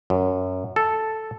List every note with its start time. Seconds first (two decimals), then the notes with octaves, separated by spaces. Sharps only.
0.10 F#2
0.76 A4